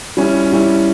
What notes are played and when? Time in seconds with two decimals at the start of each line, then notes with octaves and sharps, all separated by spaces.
0.17 G3 C#4 E4
0.52 G3 C#4 E4